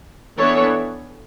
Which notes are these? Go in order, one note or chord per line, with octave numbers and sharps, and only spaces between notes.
E3 B3 D4 A4 C#5